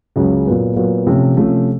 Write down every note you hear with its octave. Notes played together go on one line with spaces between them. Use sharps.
C#2 C#3 F#3
A#2 F#3 B3
A#2 F#3 B3
C3 F3 A3 C#4
C3 F3 A3 C#4